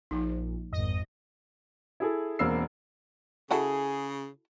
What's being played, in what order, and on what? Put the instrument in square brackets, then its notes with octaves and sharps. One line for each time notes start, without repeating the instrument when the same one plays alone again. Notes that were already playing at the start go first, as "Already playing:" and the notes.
[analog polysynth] A#1 [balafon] F3 D#4
[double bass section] G#1 [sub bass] F2 [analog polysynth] D#5
[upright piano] E4 G#4 A4
E1 A#3 C4 E6 C7
[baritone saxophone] C#3 [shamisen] E4 F#4 A4 [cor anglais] G#4